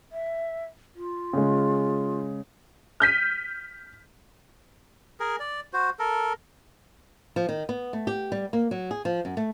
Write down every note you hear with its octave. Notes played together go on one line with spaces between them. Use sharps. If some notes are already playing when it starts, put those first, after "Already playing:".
E5
F4
C#3 G#3
F6 G6 B6 D#7
G#4 A#4
D5
F#4 C5
A4 A#4
F3
D#3
B3
A3
G4
G3
A#3
F#3
G#4
F3
F#2
A3